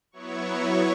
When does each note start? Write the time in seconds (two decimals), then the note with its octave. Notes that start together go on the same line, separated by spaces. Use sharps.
0.12 F#3 B3 E4 C#5 C#6
0.49 C#5 C#6